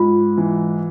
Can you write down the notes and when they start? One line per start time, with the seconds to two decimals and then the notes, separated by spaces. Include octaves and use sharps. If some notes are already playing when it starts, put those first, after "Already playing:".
Already playing: G#2 F4
0.37 E3